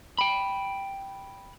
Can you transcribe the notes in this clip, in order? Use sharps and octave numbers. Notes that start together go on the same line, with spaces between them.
G5 B5